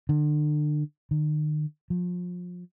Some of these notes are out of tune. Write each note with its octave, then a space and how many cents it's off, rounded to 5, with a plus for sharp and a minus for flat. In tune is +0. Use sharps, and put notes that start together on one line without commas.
D3 +35
D#3 -40
F3 +30